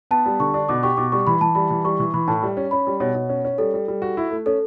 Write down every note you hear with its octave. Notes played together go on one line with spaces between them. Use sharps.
B3 A5
G3
D3 C#6
D4
B2 D6
G4 C#6
B2 D6
G3 C#6
E3 B5
E3 A5
G3 B5
E3
G3 C#6
E3 C#6
E3 B5
A2 A5
G3
C#4
C#4 B5
G3
B2 C#5
B2
C#4
C#4
G3 A4
G3
G3
F#4
E4
A3
C#4 A4